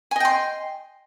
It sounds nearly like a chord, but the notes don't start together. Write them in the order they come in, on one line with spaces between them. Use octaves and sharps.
G#5 D#5 G5 C6